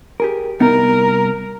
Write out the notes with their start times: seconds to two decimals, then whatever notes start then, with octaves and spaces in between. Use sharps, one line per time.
0.20 G4 G#4 A#4
0.60 C2 B3 D#4 A#4